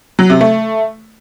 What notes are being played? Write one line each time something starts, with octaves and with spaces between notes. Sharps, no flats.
F#3
C3
A3